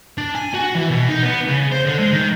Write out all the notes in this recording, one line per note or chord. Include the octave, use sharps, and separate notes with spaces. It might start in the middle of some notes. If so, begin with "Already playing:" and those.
D4
G#5
F#4
E3
B2
D#4
B3
C#3
C5
D3
G#3
D#3